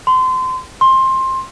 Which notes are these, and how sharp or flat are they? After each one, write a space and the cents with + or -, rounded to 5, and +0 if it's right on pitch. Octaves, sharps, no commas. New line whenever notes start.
C6 -25
C6 +15